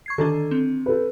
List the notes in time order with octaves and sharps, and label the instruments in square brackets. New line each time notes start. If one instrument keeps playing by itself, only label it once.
[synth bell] C#6 G#6 C7
[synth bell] D3 D#3 D4 [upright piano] A4
[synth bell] C4
[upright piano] A4 B4